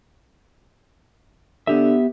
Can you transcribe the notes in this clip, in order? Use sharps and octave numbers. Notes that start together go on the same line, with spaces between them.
D3 B3 G4 E5